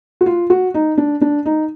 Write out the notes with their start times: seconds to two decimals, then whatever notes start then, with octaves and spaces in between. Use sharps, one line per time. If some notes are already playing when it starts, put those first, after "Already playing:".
0.21 F#4
0.26 F4
0.50 F#4
0.74 D#4
0.98 D4
1.21 D4
1.45 D#4